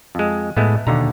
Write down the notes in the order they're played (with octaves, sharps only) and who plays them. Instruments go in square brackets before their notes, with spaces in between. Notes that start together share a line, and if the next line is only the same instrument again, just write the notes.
[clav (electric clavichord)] F2 G#3
[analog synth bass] A2 [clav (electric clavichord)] G#3 A3 B3
[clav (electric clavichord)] D#2 D3 A#5 [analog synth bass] B2